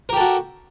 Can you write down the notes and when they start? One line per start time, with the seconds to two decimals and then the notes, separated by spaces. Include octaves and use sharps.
0.09 A#4
0.13 G4
0.17 A4
0.20 F#4